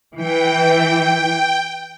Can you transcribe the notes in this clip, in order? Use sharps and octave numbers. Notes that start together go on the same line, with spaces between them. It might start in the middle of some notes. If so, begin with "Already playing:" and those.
E3 G5